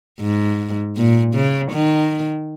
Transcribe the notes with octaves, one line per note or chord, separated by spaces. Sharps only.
G#2
A#2
C#3
D#3